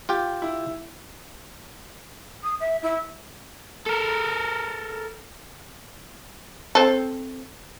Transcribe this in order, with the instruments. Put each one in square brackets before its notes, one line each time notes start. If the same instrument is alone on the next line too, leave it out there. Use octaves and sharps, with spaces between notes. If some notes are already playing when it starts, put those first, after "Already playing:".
[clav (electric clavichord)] F4 G4 G5
[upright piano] E4
[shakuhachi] D#6
E5
E4
[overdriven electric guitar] A4 A#4
[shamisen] C4 A4